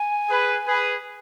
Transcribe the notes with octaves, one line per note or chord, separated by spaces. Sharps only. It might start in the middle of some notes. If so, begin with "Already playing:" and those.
Already playing: G#5
G#4 B4
G#4 B4